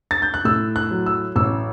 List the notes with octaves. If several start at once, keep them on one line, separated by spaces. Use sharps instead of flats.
A6
G6
F#6
A2 E6
F#6
F#3
E6
A1 E6